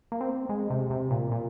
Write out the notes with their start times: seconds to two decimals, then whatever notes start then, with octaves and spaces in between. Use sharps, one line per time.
0.12 A#3
0.21 C4
0.49 G#3
0.70 C3
0.90 C3
1.11 A#2
1.31 A#2